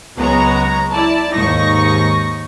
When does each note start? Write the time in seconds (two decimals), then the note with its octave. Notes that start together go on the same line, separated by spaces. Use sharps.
0.17 C#2 F#3 G#3 B3 C#5 A#5
0.92 E4 D5 A5
1.34 D#2 G#2 D#4 C#6 A#6